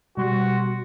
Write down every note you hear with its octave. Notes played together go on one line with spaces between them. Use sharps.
B2 G3 F#4 C6